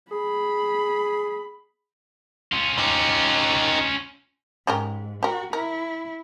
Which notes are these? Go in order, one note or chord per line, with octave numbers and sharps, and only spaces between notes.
G#4 B5
C#4 F4
D#4 G4
G#2 C#3 G4 A#4
F#4 G4 A#4
E4 A#4